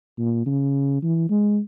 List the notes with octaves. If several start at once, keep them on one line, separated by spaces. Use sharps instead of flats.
A#2
C#3
E3
G#3